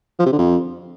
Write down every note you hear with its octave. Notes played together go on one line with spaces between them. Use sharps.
F3
C3
D3
F2